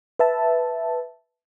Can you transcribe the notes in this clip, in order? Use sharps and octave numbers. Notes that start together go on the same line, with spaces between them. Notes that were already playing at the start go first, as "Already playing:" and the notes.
B4 E5 A5